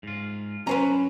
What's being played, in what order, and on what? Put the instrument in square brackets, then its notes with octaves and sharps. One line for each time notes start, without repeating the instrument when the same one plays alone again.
[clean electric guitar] G#2 F4
[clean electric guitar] F#2 F#3 [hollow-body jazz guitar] C#4 [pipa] B4 C5 A#5